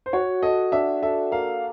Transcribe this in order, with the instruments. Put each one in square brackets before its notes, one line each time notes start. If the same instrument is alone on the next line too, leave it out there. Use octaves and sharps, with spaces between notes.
[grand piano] C5
[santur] F#4 [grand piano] C#5
[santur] A4 [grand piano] D#5
[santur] D4 [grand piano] E5
[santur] A4 [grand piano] E5
[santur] A#3 [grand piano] F5